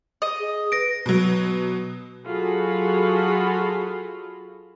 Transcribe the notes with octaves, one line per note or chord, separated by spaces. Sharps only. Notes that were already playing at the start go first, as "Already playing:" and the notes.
D#5
G#4
B4 A#6 D7
B2 F#3
F#3 F4 F#4 G#4 A4 B5